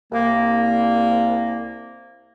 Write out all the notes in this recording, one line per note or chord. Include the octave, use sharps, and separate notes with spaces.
C2 A#3